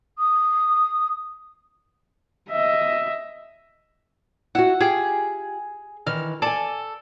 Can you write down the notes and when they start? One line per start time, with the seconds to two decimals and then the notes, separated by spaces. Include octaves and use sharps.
0.19 D#6
2.49 D#5 E5
4.55 E4 F#4 F#5
4.81 F4 G4 G#4
6.07 D#3 E3 F6
6.42 A4 D5 G#5 A5